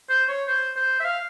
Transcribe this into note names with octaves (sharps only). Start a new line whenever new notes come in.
C5
C#5
C5
C5
E5
F5